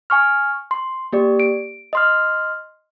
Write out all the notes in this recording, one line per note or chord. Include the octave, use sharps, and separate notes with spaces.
G#5 C#6 F6
C6
A#3 G4 D5
D7
D#5 C6 F6